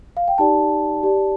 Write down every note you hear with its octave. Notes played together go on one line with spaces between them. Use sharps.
F5
G5
D#4 G4 D5 A5
G4 D5